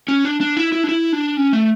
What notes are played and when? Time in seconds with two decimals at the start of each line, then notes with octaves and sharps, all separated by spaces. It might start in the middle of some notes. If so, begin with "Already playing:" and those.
0.08 C#4
0.25 D4
0.41 D4
0.57 E4
0.72 E4
0.84 D4
0.89 E4
1.13 D4
1.37 C#4
1.53 A3